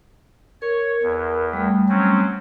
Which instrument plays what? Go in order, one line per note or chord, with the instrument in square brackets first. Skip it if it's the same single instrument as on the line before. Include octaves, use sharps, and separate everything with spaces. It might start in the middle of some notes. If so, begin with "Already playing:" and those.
[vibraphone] A#4 [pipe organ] C#5
[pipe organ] E2
[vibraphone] G3 A3
[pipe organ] F#3 C4 C#4